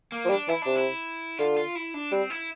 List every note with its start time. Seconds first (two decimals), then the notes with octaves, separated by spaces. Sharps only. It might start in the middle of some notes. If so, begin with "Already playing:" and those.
0.12 A#3
0.25 F3
0.30 G3 D4
0.48 E3 E4
0.62 C3 D4
0.76 E4
1.39 D3 F4
1.57 F4
1.75 E4
1.94 D4
2.12 G3 C4
2.30 E4